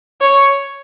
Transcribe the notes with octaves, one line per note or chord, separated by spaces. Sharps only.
C#5